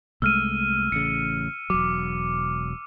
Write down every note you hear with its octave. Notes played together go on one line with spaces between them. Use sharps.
C2 G#3 A3 E6 F6 D#7
A1 C#3 C#7
E1 F#3 D6